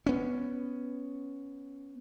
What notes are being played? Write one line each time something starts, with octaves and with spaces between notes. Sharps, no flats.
B3 C#4